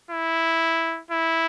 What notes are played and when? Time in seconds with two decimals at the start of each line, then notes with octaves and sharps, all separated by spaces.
0.11 E4
1.10 E4